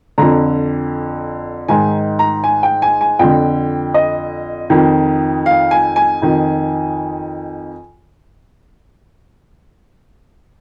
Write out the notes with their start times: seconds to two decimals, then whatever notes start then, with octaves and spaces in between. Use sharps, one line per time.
0.18 F2 D3 A#5
1.68 G#2 D#3 G#5
2.19 A#5
2.44 G#5
2.63 G5
2.82 G#5
3.01 G#5
3.19 F2 D3 G5
3.94 D#5
4.70 F2 D#3
5.46 F5
5.71 G#5
5.96 G#5
6.22 F2 D#3